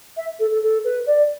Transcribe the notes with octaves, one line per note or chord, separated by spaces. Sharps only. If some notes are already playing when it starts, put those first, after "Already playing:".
E5
A4
A4
A4
B4
D5